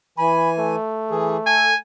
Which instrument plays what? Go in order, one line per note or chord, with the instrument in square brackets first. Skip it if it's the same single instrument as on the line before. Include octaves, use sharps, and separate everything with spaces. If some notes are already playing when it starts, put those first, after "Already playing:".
[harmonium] E3 G#5 [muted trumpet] B5
[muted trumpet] A3
[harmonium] E3 G#4
[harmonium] A4 [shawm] G#5